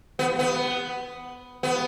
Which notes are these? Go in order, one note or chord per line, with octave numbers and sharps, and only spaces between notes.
B3
B3
B3